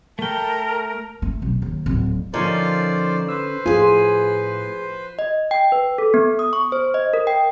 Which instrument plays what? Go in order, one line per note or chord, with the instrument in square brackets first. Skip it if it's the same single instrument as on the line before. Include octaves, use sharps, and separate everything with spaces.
[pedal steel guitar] A3 G5 [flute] A#4 [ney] A5
[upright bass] A3
B1
D#2
D1
[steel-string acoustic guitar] D3 C#4 [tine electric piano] F3 D#4 A#4 [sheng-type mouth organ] F4 C5 D5
[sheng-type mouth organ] B4 C5 [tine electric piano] E6
[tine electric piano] A2 [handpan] F4 [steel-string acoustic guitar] G#4 G#5
[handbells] D#5
G5
B4
A4
B3
D#6
C#6
C5
D#5
A#4
G5